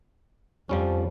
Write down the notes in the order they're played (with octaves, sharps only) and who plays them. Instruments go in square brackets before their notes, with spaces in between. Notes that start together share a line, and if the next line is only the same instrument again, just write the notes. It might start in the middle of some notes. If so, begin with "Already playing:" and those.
[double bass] F2 [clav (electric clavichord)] F3 G3 C#4